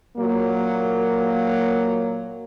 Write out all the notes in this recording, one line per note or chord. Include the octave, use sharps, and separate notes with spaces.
A#2 F#3 A#3